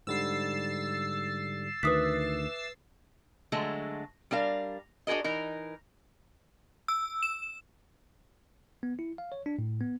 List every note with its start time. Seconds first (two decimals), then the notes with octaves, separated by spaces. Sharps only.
0.07 G#2 D3 G3 E6 A6 C7
1.83 D2 D#3 B4 E5 D6 D#6 F#6 B6
3.52 D3 F#3 G#3 A3
4.31 G3 D4 A#4 F5
5.07 D4 F#4 G#4 A#4 D#5
5.24 E3 D#4 A#4
6.88 E6
7.23 E7
8.83 B3
8.99 E4
9.18 F5
9.32 C#5
9.46 D4
9.59 A2
9.80 B3